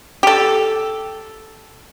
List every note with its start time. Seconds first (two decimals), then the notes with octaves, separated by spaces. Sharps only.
0.23 G4 A4